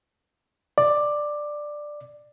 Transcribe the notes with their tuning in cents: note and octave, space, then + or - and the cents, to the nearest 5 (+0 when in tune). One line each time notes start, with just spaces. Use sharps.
D5 +10